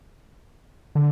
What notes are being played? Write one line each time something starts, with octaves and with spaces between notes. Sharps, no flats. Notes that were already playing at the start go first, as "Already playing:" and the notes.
D3